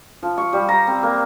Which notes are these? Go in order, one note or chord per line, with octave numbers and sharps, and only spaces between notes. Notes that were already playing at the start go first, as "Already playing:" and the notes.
F3
C#6
G3
A#5
C4
A#3